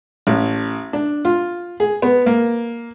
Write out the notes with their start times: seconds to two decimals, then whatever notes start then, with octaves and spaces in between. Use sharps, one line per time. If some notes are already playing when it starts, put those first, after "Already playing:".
0.27 A1
0.93 D4
1.25 F4
1.80 G#4
2.02 B3
2.26 A#3